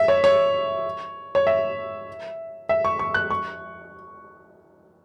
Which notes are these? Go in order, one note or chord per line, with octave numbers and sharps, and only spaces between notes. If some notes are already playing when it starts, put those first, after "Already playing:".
Already playing: E5
C#5
C#5
C#5
E5
E5
C#6
C#6
F#6
C#6